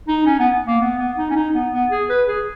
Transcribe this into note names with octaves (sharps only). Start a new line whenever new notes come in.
D#4
C#4
B3
A#3
B3
B3
D#4
C#4
D#4
B3
B3
G#4
B4
G#4